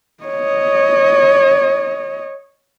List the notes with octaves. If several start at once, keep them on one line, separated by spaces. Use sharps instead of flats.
C#5 D#5